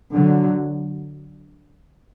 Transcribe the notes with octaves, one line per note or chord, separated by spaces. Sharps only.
D3 F#3